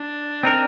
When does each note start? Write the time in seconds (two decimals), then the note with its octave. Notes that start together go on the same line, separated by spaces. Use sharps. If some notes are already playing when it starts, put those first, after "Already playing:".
Already playing: D4
0.43 C4 D#4 A#4